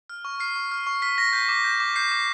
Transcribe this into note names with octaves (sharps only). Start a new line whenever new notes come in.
F6
C#6
F6 C7
C#6
F6
C#6
F6 B6
C#6 A#6
G6 B6
D6
G6
D6
G6 C7
D6